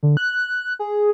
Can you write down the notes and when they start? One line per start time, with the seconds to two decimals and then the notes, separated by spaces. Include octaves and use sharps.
0.03 D3
0.17 F#6
0.79 G#4